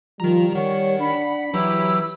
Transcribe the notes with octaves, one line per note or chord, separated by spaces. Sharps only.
D#3 F3 G3 A#5
D#3 C#5 F#5
D4 B5
E3 F#3 E4 G4 E6